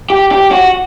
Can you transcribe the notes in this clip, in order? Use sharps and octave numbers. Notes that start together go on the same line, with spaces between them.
G4
G4
F#4